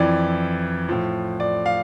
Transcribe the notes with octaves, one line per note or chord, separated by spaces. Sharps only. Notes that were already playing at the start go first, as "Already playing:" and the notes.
Already playing: F2 E3 D5
A2 F3
D5
F5